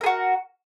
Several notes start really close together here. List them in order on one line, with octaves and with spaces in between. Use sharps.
A#4 G#4 F#4